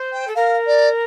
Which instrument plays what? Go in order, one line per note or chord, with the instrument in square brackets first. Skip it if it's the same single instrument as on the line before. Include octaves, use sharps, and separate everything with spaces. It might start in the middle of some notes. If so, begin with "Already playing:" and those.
Already playing: [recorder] C5
[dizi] G5
[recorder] A4
[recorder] A#4 [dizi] F5
[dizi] D5